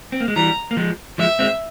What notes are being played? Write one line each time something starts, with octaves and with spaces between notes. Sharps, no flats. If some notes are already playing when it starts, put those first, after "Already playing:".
C4
A#3
G#3
E3 G3 A#5
A#3
F3 G#3
F3 G#3 E5
G#3 C4